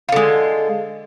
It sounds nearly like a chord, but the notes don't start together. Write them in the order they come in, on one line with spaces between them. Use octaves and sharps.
F4 D3 G#3